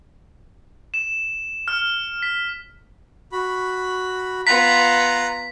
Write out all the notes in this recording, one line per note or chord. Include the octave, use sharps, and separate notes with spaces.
E7
F6
B6
F#4 B5
B3 F4 A#5 F#6 B6